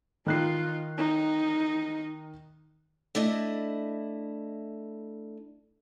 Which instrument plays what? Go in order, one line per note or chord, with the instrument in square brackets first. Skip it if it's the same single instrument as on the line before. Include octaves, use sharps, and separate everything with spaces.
[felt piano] D#3 F#6 C7 [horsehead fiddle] D#4 F4
[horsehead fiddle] D#4
[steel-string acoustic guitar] A3 D4 E4 D#5